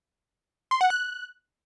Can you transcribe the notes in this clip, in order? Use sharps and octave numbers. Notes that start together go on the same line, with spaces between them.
C6
F#5
F#6